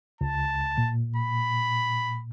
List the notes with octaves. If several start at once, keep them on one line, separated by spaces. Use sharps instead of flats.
C#2 A5
A#2
B5